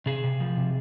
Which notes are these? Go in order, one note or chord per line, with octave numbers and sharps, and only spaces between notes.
C3 G#4
C3
F3
C3